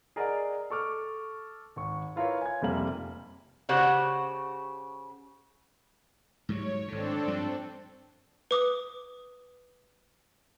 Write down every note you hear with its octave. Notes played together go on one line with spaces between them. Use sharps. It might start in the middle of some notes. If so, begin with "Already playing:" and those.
G#4 A#4 D5 D#5 F#5 A#5
A4 C#6 D6 F6
G#1 C#6
E4 F4 A#4 B4 C#5
G#5 G#6
F1 F2 C3 G3 A#3 F#7
C#3 F#4 G4 C5 F#5
G#2 F#3 G3 C#5
G#1 A2 C4 D4 A4
G2 F3
B4 D6 D#6